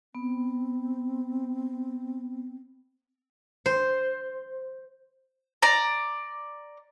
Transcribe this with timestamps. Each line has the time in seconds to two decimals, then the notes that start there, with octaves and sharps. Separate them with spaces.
0.15 B3 C4
3.66 C5
5.62 D5 A#5